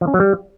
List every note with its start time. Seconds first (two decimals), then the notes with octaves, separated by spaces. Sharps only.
0.01 F3
0.07 C#4
0.14 F#3
0.20 G3